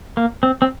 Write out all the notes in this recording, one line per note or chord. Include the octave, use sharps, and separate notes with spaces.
A#3
C4
C4